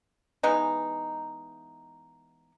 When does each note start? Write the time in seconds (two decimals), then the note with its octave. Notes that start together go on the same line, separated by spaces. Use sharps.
0.43 E3 G#3 B3 D#4